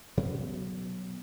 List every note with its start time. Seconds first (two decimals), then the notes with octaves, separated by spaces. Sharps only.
0.17 B2 F#3 B3 C#4